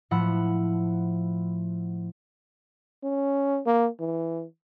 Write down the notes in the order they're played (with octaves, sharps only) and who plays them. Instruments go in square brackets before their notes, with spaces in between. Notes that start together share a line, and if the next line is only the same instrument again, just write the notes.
[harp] A2 F3 F#5 B5 E6
[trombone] C#4
A#3
E3